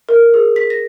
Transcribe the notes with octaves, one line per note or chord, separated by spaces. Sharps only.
A#4
G#4
B6
A#6